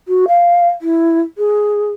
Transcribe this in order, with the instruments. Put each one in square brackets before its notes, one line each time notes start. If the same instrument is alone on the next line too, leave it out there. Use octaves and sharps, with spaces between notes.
[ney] F#4
F5
E4
G#4